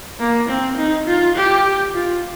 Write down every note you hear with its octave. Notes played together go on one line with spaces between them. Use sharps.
A#3
C4
D#4
F4
G4
F4